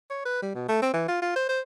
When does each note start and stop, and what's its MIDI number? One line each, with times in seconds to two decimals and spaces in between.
0.10 0.21 73
0.25 0.40 71
0.43 0.55 55
0.55 0.67 47
0.69 0.80 57
0.82 0.90 60
0.94 1.06 52
1.08 1.20 65
1.22 1.32 65
1.36 1.47 72
1.49 1.61 72